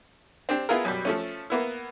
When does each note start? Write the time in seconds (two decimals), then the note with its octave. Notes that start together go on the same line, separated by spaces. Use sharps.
0.49 C4 D4 G4
0.69 B3 E4 F4 G#4 A#4
0.85 F#2 B2 G3
1.05 F3 A3 C#4
1.50 A#3 B3 E4